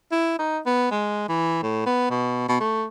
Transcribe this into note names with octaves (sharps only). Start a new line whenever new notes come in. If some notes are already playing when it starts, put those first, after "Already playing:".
E4
D#4
B3
G#3
E3
A2
B3
B2
B2
A3